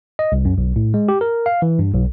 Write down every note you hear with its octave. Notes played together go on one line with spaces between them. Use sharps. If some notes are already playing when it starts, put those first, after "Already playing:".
D#5
C2
F#2
B1
A2
G#3
G4
A#4
F5
E3
G2
B1